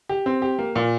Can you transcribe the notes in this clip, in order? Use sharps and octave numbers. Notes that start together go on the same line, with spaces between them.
G4
C4
G4
A#3
A#2